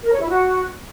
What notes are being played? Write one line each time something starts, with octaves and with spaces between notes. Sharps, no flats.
A#4
C#5
E4
F#4